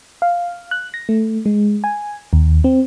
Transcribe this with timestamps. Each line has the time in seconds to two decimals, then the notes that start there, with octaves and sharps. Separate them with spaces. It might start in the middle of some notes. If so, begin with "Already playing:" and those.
0.22 F5
0.71 F#6
0.94 A#6
1.09 A3
1.46 G#3
1.84 G#5
2.33 D#2
2.64 C4